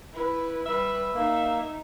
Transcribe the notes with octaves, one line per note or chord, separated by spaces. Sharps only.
E4 B4
G3 B4 E5
A#3 D#4